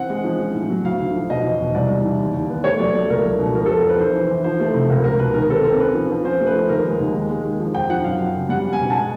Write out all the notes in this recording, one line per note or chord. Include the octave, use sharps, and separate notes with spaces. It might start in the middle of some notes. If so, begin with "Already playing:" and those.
Already playing: E3 C4 F#5
G#3
F3
C#4
A2
F#3
D2 F5
D3
F3
B2 D#5
E2
B2
C2 D5
C2
E3
D#2
D#2
B3
A3 C#5
F#3 D5
A3 D5
C#2 A#4
F#3
B2
F3 A#4
F2 A4
A#4
F2 B4
E3 C5
E3
E3
F3 C5
A3
C3
C#2 A#4
C#2 A#4
B2 B4
D#3 A#4
C4 A4
C4 A#4
C#4 B4
F3
F3
C#4 C5
A3
B4
F3
D#2 A#4
G#3
D#2
G#3
G#3
D#3
F3
F2 G5
F3 F#5
F#2 F5
F#2
C#3
G3 F#5
C#4
G#5
B2
A5
G#3 G#5